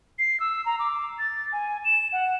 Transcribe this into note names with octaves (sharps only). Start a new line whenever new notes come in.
C7
E6
A#5
D6
A6
G#5
E7
F#5